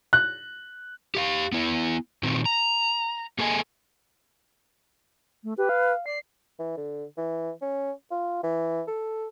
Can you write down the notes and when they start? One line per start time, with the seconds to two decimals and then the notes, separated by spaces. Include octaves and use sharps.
0.13 F#6
1.15 G4 E5 F5
1.52 B3 E4
2.23 A#2 D#3 C4
2.46 A#5
3.38 A#3 G#4 A4 D#5 G#5
5.44 A3
5.58 G4 B4
5.69 F5
6.06 D5 C7
6.59 E3
6.77 D3
7.17 E3
7.62 C#4
8.11 F4
8.43 E3
8.87 A4